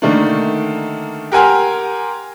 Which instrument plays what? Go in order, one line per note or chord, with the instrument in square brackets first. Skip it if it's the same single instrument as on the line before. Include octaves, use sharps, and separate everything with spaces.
[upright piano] D3 D#3 A3 A#3 D4
G4 A#4 F#5 G#5 C6 F6